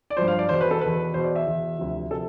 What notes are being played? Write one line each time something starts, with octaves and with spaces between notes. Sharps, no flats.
D5
G2 F3 C5
F5
D5
E2 B2 C5
B4
A4
E2 B2 B4
E2 B2 C5
D5
E5
E2 B2
D2 C3 F3
C3 F3 A4